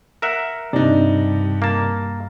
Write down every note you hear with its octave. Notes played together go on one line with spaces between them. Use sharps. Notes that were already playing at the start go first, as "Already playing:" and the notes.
A#4 E5 F#5
G2 C3 D4 D#4
A#3 A5